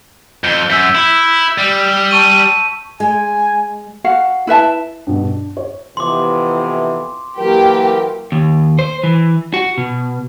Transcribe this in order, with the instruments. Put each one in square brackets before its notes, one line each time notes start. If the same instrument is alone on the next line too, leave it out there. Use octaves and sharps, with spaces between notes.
[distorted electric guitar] F2 [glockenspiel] G6 C#7 G7
[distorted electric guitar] F#2 [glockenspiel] E6 G6 B6
[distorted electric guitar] E4
G3
[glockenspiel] A5 C#6 D#7
[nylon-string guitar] G#3 [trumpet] G#5
[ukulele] F#4 F5 F#5
E4 B4 E5 A5
[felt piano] G2 B2
D4
C#5
[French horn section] F2 C3 E3 [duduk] B3 [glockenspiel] C6 D6
[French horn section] E3 F#3 A#4 [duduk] A#3 [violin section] G4
[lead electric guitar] D#2
C5
E3
F#4
B2